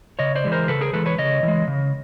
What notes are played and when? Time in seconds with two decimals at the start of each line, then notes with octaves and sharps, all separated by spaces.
0.19 C#3 C#5 D#5
0.35 C5 D5
0.44 E3 G#3
0.52 A#4 C5
0.68 C#3 A4 B4
0.81 G#4 A#4
0.93 E3 G#3 A4 B4
1.06 B4 C#5
1.18 C#3 C#5 D#5
1.43 E3 G#3
1.68 C#3